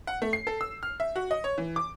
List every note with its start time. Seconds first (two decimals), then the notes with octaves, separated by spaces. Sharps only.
0.07 F#5
0.22 A3
0.33 C7
0.47 A4
0.61 E6
0.83 F6
1.00 E5
1.16 F#4
1.31 D#5
1.44 C#5
1.58 E3
1.76 D6